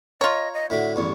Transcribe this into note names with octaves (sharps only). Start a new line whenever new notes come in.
F4 C#5 D#5 A#5
D#5
A2 D3 F#4 E5
A1 E2 G2 C#6